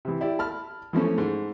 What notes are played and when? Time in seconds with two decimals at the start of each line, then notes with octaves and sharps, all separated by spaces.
0.05 C3 E3
0.21 E4 G4 D5
0.39 A5 B5 F6
0.93 E3 F3 A3 C#4
1.18 G#2